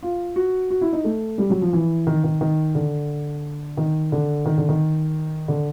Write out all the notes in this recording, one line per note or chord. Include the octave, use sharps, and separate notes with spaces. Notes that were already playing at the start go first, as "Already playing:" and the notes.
F4
F#4
F#4
E4
D#4
A3
G3
F#3
F3
E3
D#3
D#3
D#3
D3
D#3
D3
D#3
D3
D#3
D3